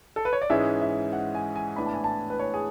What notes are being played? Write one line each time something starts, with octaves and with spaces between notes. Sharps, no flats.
A4
B4
C#5
D5
G#2 E3 G#3 C#4 E5
E5
F#5
G#5
G#5
A2 E3 B3 D4 B5
A5
G#5
A5
B4
C#5
G#4